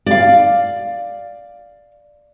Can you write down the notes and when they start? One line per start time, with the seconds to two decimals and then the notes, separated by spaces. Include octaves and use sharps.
0.06 D5 F5